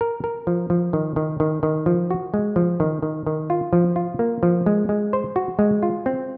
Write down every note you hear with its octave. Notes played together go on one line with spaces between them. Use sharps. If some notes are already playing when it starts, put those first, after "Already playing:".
A#4
A#4
F3
F3
D#3
D#3
D#3
D#3
F3
F#4
G#3
F3
D#3
D#3
D#3
F4
F3
F4
A#3
F3
G#3
G#3
C5
F#4
G#3
F4
C4